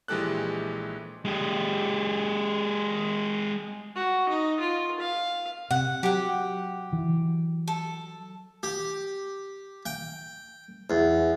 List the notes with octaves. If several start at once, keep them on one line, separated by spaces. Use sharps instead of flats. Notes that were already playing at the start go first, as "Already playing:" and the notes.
A#1 E3 G#3 G4 A4 F#6
G#3 G4
F#4
D#4
F4
F5
C3 F#5
F#3 G4 F#5
E3
A4
G4
G5
E2